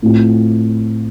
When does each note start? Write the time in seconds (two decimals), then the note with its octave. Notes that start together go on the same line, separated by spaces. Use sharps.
0.02 A2 A3 C4 F4